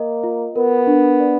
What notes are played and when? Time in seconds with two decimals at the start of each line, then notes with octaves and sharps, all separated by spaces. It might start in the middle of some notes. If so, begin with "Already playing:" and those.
Already playing: A#3 D#5
0.24 F4
0.56 B3 A#4
0.87 D4
1.20 D5